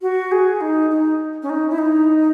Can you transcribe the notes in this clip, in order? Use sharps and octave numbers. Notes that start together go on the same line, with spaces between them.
F#4
G#4
D#4
D#4
C#4
D#4
E4
D#4